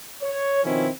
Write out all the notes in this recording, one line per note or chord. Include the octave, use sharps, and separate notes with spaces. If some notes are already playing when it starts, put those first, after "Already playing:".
C#5
B2 D#3 F3 C4 C#4 E4